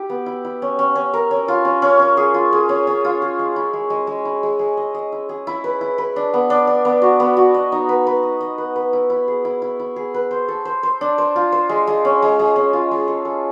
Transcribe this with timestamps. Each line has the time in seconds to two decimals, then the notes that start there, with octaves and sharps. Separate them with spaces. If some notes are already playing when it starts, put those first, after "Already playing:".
Already playing: E4 G4
0.09 B3
0.26 E4
0.45 E4
0.62 C#4
0.79 C#4
0.95 C#4
1.14 A#4
1.31 C#4
1.48 F4
1.65 C#4
1.82 C#4
1.99 C#4
2.17 G#4
2.34 F4
2.52 G#4
2.69 C#4
2.87 C#4
3.04 F4
3.22 G#4
3.39 G#3
3.56 E4
3.73 G#3
3.90 G#3
4.07 G#3
4.25 E4
4.43 G#3
4.59 G#3
4.77 D#5
4.94 D#5
5.12 E4
5.29 G#4
5.47 E4
5.64 B4
5.81 E4
5.98 B4
6.16 D4
6.34 B3
6.50 D4
6.67 D4
6.85 B3
7.02 F#4
7.20 B3
7.37 F#4
7.54 D#5
7.72 D#4
7.89 B4
8.07 B4
8.23 D#5
8.41 D#5
8.58 B4
8.76 B4
8.93 E4
9.10 E4
9.28 G#4
9.45 E4
9.62 E4
9.79 E4
9.96 G#4
10.14 B4
10.31 C5
10.48 A4
10.65 C5
10.83 C5
11.01 D4
11.18 C5
11.36 F4
11.52 C5
11.69 G#3
11.87 G#3
12.05 C#4
12.22 G#3
12.39 G#3
12.56 C#4
12.73 F4
12.91 G#3
13.08 A4
13.25 A4